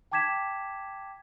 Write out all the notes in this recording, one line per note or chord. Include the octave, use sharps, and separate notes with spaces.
G5 A5 D6 G#6 B6 E7